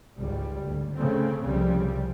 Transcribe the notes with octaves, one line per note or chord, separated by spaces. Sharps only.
G#1 C#2 G3
D2
C#3 A3 C4
C2 C#3 F3 G3 C4